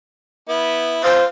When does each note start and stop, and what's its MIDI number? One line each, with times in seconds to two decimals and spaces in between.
0.48 1.01 59
0.48 1.01 64
1.04 1.26 65
1.04 1.24 72